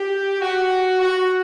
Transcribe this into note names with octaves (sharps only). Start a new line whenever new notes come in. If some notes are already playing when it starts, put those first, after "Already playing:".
Already playing: G4
F#4
F#4